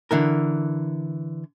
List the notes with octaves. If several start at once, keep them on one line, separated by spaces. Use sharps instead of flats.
D3 E3 A#4